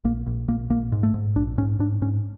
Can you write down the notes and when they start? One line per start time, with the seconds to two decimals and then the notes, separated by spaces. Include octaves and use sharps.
0.04 A#1 A#3
0.26 A#1
0.48 A#1 A#3
0.70 A#1 A#3
0.92 G#2
1.03 A3
1.14 G#2
1.36 A#1 D4
1.58 G#2 C#4
1.79 G#2 D4
2.02 G#2 C#4